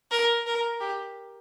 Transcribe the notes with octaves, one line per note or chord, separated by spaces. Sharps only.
A#4
A#4
G4